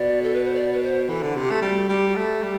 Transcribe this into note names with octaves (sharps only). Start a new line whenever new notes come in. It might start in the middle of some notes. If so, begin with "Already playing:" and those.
Already playing: B2 D5
A4
B4
C5
D5
B4
C5
E3 A4
D3
C3 G4
A3
G3 F#4
G3 G4
F#4
A3 G4
G3